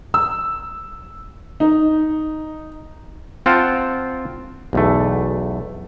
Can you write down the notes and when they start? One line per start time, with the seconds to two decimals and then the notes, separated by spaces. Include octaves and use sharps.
0.14 E6
1.60 D#4
3.46 C4 F4 F#5 G5 A5
4.73 B1 E2 A3